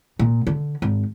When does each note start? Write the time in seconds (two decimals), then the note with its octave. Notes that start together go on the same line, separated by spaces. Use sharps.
0.19 A#2
0.47 D3
0.82 G#1